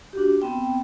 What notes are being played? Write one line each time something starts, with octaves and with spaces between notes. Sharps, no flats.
D4 F#4 G4
B3 C4 G5